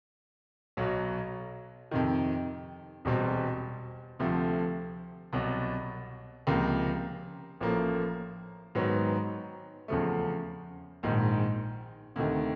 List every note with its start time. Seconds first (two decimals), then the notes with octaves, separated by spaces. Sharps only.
0.77 B1 B2 F#3
1.91 F2 C3 D#3
3.05 E1 E2 B2 G3 C4
4.19 D2 C3 F3 A3
5.33 C2 B2 F#3
6.47 C#2 C3 F3 A#3
7.61 A1 A2 F3 A#3
8.75 G#2 D#3 F#3 B3
9.88 E2 C#3 F3 A3
11.03 A#1 G#2 D#3
12.16 D2 C3 D#3